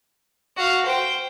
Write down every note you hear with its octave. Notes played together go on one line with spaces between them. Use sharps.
F#4 F5
C5 G5